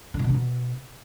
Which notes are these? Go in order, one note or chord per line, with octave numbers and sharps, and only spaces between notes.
D3
A#2
B2
D3
B2